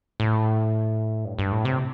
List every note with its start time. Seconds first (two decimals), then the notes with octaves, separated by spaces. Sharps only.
0.20 A2
1.25 G2
1.39 G2
1.52 A2
1.65 C3